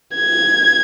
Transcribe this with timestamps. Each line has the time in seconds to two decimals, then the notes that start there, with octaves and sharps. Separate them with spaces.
0.16 G#6